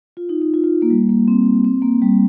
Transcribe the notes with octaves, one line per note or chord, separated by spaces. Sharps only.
F4
D#4
D#4
F4
F4
A#3
G3
A#3
C4
C4
A#3
G3